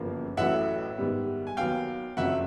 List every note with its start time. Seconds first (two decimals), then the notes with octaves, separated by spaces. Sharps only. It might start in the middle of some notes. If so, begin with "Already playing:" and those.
Already playing: G1 F#2 C#3 F3 A#3
0.37 A1 A2 F#3 A3 E5 F#5
0.98 G#2 D#3 G3 B3
1.47 G#5
1.57 D#2 D#3 F#3 B3 F5 G5
2.17 F#1 F2 C#3 F#3 E5 F#5